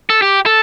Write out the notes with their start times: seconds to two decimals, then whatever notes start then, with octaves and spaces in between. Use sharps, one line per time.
0.10 A4
0.22 G4
0.46 A4